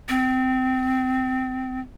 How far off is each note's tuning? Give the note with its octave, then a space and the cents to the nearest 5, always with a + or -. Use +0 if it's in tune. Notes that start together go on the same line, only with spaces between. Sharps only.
C4 -20